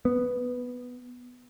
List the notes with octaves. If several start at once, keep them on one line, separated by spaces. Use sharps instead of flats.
B3